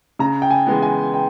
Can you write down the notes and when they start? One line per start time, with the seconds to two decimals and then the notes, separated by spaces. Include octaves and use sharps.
0.19 C#3 A#5
0.42 G5
0.51 G#5
0.67 E3 G#3 B3
0.82 G#5
1.14 G5